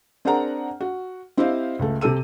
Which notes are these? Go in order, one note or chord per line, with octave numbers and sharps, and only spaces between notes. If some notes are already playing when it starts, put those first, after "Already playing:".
C4 D4 G#4 A#4 F#5 A#5
F#4
C4 E4 G4 C5 D#5 F5
C#2 A3
C3 G4 A4 E6 D#7